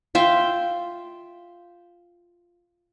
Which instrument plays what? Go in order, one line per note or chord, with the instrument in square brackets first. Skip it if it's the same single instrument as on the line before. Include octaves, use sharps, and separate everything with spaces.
[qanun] F4 E5 G5